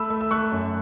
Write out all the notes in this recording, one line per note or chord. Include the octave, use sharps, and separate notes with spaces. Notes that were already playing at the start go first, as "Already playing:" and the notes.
Already playing: A3 B5 E6
A3
E6
A3 C#6 F#6
F#2